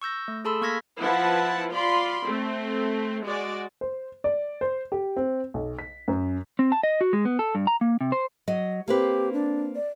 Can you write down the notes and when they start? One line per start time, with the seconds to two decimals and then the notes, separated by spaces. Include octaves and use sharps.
0.02 C#6 E6 G6 A#6
0.28 A3
0.45 G#4 A4 A5 B5 C6 E6
0.62 A#3 C#6 F6 G#6 A#6 B6
0.99 F3 E4 B4 F#5 A5
1.73 F4 D5 B5 C6
2.25 A3 C4
3.25 G#3 F#4 D5
3.81 C5
4.24 D5
4.61 C5
4.92 G4
5.16 C4
5.54 B1
5.79 B6
6.08 F#2
6.59 C4
6.72 A5
6.83 D#5
7.01 F#4
7.13 G#3
7.25 B3
7.39 A4
7.55 G2
7.67 A#5
7.81 A#3
8.01 C3
8.12 C5
8.47 F#3 D#5
8.88 A#3 C4 G4 B4
9.33 D4
9.75 D5